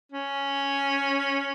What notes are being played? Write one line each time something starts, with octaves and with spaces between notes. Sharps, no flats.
C#4